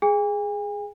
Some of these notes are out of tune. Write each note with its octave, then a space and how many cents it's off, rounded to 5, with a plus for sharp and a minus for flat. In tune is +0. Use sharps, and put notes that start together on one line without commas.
G#4 +0 G#5 -45